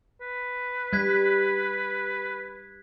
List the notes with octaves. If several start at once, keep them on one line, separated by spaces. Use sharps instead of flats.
B4
G3 F#6 G#6 B6